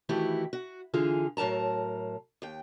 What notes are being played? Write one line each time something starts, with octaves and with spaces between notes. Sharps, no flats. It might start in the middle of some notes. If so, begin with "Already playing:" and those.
D#3 E3 A3 E4 F#4 G4
F#4
D3 E3 F4 G#4
A2 F#3 A#4 A5 A#5
D#2 G5